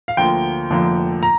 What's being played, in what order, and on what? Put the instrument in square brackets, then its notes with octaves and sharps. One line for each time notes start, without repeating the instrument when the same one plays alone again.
[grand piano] F5
D2 D3 F3 A#3 G5
F1 F2 D3 F3 A#3
A#5